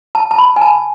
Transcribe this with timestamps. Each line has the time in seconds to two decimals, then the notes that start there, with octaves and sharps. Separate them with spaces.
0.15 A5
0.31 A5
0.38 B5
0.56 G#5
0.61 A5